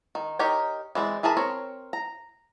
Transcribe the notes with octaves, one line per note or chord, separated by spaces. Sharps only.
D#3
D#4 G4 A#4 C#5 G5
E3 G#3 C4 D5
E3 G#4 A#4 A5 B5
C4 A#4 C#5
A#5